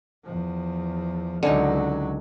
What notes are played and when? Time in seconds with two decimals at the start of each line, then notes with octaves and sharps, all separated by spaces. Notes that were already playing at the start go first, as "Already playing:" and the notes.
0.24 E2 F3
1.43 C#2 D3 F#3 C#4 D#4